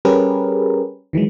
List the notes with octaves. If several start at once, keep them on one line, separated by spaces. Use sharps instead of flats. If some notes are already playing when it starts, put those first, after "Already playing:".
G3 C#4 G4 G#4 A#4 B4
D#3 E3 F#3 G#3